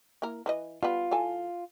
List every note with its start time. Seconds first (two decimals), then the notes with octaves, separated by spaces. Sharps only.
0.22 A#3 E4 A#4
0.46 E3 B4 D#5
0.83 G3 B3 F4 B4
1.11 E3 A4 G#5